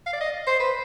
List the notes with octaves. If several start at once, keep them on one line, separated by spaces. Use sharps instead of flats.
F5
D5
D#5
C5
B4